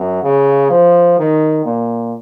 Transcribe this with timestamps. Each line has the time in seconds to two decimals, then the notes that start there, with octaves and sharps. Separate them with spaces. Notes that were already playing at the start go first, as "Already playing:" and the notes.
Already playing: F#2
0.24 C#3
0.71 F3
1.19 D#3
1.65 A#2